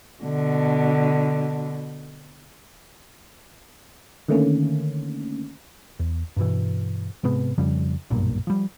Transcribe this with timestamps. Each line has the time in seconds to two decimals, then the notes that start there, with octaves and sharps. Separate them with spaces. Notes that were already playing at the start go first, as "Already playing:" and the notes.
0.23 B2 D3
4.28 D3 D#3 A3 A#3 C#4
5.99 E2
6.36 G2 B2 E3
7.23 G#2 C3 G#3 B3
7.58 F2 C#3 F3 G3
8.10 F#1 B1 G2 A#2
8.47 F3 G3